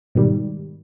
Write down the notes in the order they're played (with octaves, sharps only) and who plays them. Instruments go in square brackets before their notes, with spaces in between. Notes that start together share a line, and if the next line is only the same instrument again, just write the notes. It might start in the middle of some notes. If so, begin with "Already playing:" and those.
[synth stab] G#2 B2 D#3 G3